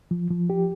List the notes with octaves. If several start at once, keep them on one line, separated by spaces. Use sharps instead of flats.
F3
F3
G4